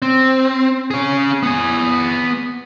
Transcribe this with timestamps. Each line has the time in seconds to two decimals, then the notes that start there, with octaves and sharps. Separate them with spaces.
0.02 C4
0.91 C#4 G#4
1.43 B3 G#5